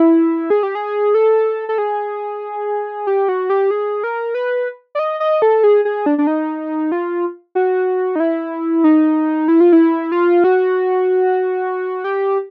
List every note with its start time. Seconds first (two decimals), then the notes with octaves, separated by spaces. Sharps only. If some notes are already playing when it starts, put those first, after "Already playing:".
Already playing: E4
0.50 G#4
0.63 G4
0.75 G#4
1.14 A4
1.69 A4
1.78 G#4
3.07 G4
3.29 F#4
3.50 G4
3.71 G#4
4.04 A#4
4.34 B4
4.95 D5
4.99 D#5
5.20 D#5
5.42 A4
5.64 G#4
5.85 G#4
6.06 D4
6.18 D4
6.27 D#4
6.92 F4
7.55 F#4
8.16 D#4
8.20 E4
8.84 D#4
9.48 E4
9.60 F4
9.73 E4
10.12 F4
10.44 F#4
12.04 G4